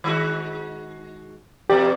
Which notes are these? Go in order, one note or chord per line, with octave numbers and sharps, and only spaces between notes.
D#3 G#3 F#4
E2 B2 G4 D5